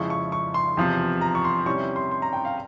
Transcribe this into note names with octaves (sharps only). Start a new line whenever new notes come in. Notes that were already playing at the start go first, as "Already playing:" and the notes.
Already playing: F2 C#3 F3 G#3 E4 C#6
C#6
C#6
C6
E2 C3 F3
A#5
C#6
C6
C3 G3 C#4 E4 C#6
C6
C6
A#5
G5
F5